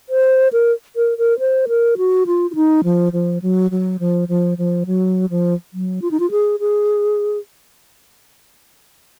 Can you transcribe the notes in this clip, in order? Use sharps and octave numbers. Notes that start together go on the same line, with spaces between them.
C5
A#4
A#4
A#4
C5
A#4
F#4
F4
F4
D#4
F3
F3
F#3
F#3
F3
F3
F3
F#3
F3
F#3
F4
D#4
F4
G#4
G#4